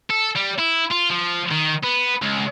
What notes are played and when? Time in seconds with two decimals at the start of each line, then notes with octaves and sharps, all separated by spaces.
0.10 A4
0.36 G3
0.59 E4
0.92 F4
1.11 F3
1.52 D#3
1.84 B3
2.22 C#2